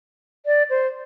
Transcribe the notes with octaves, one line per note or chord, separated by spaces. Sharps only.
D5
C5